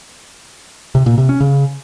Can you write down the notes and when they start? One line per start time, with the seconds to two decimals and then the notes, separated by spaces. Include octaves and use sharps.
0.95 C3
1.06 A#2
1.18 C3
1.29 C#4
1.40 C#3